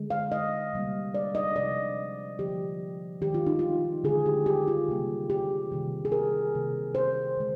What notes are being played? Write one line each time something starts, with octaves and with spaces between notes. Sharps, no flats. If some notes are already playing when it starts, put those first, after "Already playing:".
Already playing: D3 G#3
F5
D#5
C3 G3 A#3
D5
D#5
C3 F3 G#3 D5
D3 F3 A#3 G4
D#3 G#3 G4
F4
D#4
F4
D3 G#3 G#4
G4
G4
F4
C3 D#3 G3 A#3
G4
C3 D#3 G3 A#3
G#4
A#4
C3 D#3 A#3
C5
D3 G#3